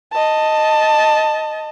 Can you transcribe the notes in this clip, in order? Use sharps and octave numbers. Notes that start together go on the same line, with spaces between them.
D#5 A5